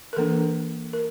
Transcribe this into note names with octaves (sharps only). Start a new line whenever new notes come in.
A#4
E3 A#3 D4 A4
A#4